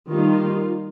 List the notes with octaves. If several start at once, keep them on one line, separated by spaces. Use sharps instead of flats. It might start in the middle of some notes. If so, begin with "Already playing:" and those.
D#3 G3 A#3 D#4 F4